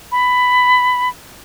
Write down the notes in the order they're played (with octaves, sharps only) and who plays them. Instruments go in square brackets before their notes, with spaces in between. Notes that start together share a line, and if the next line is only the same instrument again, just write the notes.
[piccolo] B5